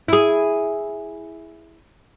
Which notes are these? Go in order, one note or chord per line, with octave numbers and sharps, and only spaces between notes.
E4 G#4